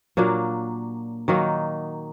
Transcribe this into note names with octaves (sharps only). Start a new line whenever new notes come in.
A#2 F#3 A#3 D4
D#3 F#3 A#3 D#4